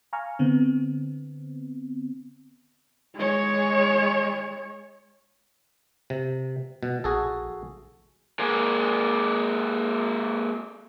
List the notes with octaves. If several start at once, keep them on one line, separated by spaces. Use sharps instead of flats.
F5 G#5 A#5 C#6 F6
D3 B3 C4
G#3 C#5
C3
B2
A#1 F#4 G#4 A4
G#3 A#3